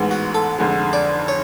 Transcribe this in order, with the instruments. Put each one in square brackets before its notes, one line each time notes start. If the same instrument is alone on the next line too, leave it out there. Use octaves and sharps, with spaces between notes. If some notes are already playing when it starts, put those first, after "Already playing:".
Already playing: [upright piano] A1 G#2 G#3 B3
[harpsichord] F#4
A4
[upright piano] F1 F2 D3 G#3
[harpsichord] D5
C#5